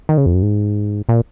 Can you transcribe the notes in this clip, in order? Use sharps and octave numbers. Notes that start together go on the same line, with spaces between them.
D#3
C#3
F2
F#2
G#2
A#2